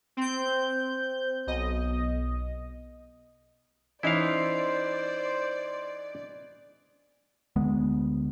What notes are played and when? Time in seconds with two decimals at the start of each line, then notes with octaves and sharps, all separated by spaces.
0.17 C4 G6
1.47 B1 D#5
4.03 E3 C#4 D#4 E4 C5 D5 F5
7.56 D2 G#3 B3